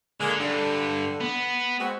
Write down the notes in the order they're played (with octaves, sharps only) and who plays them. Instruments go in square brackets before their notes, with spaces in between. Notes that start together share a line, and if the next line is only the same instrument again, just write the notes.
[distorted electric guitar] D3 [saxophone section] G#3 A#3
[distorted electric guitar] G2 [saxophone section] D3
[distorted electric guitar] B3
[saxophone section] G#3 C4 F#4